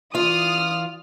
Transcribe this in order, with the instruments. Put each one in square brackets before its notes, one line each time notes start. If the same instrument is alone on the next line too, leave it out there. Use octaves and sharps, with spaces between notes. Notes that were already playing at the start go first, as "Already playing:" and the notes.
[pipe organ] E3 [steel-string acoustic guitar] F4 [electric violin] D5 F6 [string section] D#6